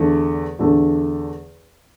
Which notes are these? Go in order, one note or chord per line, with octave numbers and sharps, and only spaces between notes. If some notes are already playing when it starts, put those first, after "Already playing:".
Already playing: E2 D3 A3
E2 D3 A3